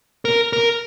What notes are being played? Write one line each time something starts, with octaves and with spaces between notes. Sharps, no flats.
A#4
A#4